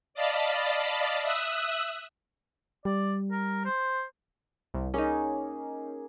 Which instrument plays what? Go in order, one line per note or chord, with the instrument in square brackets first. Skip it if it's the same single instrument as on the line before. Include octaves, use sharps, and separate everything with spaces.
[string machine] D5 D#5 F5 A5 B5
E5 D#6 E6 F#6
[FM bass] G3 [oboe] D5
[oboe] A#4
C5
[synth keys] C2
[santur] A#3 G#4 [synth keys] C#4 D#4